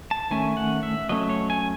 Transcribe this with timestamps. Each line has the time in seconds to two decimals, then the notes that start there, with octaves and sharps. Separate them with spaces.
0.11 A5
0.31 D#3 A3 C#4 G#5
0.57 F#5
0.83 E5
1.09 F#3 A3 C#4 D#5
1.30 C#5
1.50 G#5